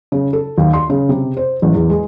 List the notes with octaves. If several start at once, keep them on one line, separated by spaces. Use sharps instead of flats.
C#3
A4
D#2
C6
C#3
C3
C5
A1
E2
G#3